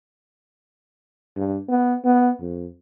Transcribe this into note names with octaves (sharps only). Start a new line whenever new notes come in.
G2
B3
B3
F2